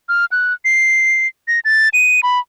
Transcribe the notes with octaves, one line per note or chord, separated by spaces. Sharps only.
F6
F#6
C7
A#6
A6
D#7
B5